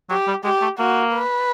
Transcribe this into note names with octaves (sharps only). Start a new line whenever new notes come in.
F#3 G4
G3
G#3 G4
A3
A#3 F#4
B4